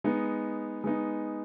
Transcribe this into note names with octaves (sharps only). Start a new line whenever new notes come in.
G#3 B3 D#4
G#3 B3 D#4